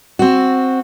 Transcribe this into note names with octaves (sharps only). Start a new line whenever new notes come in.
C4 F#4